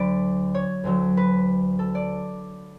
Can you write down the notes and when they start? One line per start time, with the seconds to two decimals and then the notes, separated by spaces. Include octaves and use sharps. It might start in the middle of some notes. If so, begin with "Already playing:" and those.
Already playing: D2 D3 F#3 A3 D5 B5
0.55 C#5
0.84 D2 D3 F#3 A3
1.17 B4
1.79 A4
1.95 D5